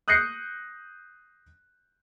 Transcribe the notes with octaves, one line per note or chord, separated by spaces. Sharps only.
D#6 F#6 G6 A#6 C7 C#7